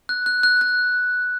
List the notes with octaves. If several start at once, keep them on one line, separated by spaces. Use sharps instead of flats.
F#6
F#6
F#6
F#6